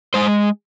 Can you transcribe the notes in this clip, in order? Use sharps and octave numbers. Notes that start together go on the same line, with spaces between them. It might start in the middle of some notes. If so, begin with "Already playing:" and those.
G#3 C5